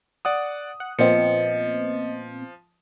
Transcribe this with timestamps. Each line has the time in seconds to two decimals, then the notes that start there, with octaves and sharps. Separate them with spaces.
0.25 D5 F#5 D#6
0.80 F#5
0.99 A#2 F3 B3 C4 D#5 C#7